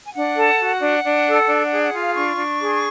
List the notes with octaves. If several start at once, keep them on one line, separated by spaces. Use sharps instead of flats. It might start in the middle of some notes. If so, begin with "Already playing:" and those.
G#5
D4 F#5
A4
F#4
D4 F#5
D4
A4
D4
F#5
G#4
F#5
F4
F5
D4 C#6
D4
G#4